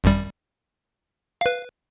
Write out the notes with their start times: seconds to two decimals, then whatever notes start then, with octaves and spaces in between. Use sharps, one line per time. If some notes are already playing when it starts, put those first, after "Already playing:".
0.04 G#1 F#2 G3
1.41 B4 F5